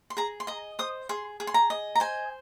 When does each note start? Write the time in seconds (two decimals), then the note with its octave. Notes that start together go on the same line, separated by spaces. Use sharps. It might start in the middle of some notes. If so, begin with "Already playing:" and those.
0.10 C6
0.17 G#4 A#5
0.40 C6
0.47 D#5 A#5
0.79 C5 D#6
1.09 G#4 C6
1.40 G#4
1.47 C6
1.54 A#5
1.70 D#5
1.95 A#5
2.00 C5 G#5